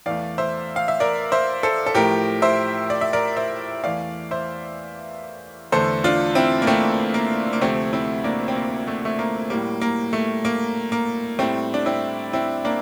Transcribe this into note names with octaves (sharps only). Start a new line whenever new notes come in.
E2 E3 A3 D5 F5
C5 E5
F5
E5
A#4 D5
C5 E5
A4 C5
A4
A2 F3 A3 G4 A#4
C5 E5
D5
E5
A#4 D5
C5 E5
E2 E3 A3 D5 F5
C5 E5
E2 D3 A3 A4 C5
D4 F4
C4 E4
A#3
A3 C4
A#3
A#3
D2 C3 F3 A3 C4
C4 E4
A#3 D4
C4
A#3
A3
A3
A#3
A2 G3 A#3
A#3
A3
A#3
A#3
A2 G3 A3 C4
D4
C4 E4
C4 E4
A#3 D4